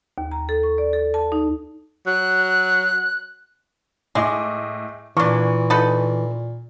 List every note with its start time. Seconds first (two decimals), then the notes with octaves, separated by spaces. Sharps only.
0.18 D#2
0.31 A#5
0.49 A4
0.63 C#6
0.78 D5
0.93 A4
1.14 A5
1.32 D#4
2.07 F#3 F#6
4.15 A2 G#3 D#5 D6
5.17 A#2 E3 A#3 D4 C#6
5.70 D#4 A4 B4